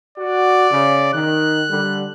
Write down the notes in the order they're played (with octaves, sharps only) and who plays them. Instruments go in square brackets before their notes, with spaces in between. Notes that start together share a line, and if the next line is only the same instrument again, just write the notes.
[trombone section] F#4 [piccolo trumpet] D5
[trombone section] C#3
[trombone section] D#3 [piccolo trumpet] F#6
[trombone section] D3 G3